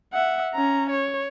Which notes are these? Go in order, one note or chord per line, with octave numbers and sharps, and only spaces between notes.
E5 F#5
C#4 A#5
C#5